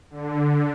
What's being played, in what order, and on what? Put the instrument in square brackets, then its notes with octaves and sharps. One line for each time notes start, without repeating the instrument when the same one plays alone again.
[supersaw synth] D3